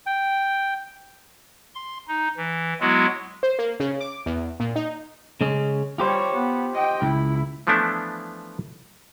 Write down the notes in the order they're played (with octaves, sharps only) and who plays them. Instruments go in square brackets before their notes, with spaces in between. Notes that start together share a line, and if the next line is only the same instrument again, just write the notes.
[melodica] G5
[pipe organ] C6
D#4
E3
F#3 G#3 B3 E4 F#4
[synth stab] C5
A#3
C#3
D6
E2
A#2
D#4
[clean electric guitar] C#3 G#3 C#4
[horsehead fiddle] G3 C#5 [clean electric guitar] F4 G4 C5
[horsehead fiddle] B3
D#5 G5
[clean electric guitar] C#2 [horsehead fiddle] E4
[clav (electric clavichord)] E3 F3 A3 B3 D4 E4